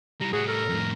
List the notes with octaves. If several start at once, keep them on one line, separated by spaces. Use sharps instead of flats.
G3 E4 A#5
A2 G3 F#4 G#4
A4 A#4
F2 A2